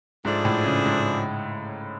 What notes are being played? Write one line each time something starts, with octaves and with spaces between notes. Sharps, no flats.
G#2 F3 A3 D4 G#4
A2
C#3
G#2